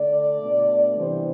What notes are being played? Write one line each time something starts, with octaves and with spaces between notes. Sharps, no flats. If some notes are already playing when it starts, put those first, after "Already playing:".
Already playing: D3 A3 D4 D5
B2 A3 D4
C3 E3 G3 B3 C4 D4 C5